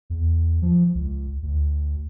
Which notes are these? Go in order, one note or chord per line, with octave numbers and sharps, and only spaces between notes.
E2
F3
C#2
D2